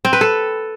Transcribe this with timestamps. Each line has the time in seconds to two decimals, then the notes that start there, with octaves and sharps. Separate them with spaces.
0.05 C4
0.13 B4
0.21 A4